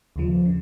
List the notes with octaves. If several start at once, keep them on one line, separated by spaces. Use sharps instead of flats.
D#2 C#3 F3
C#3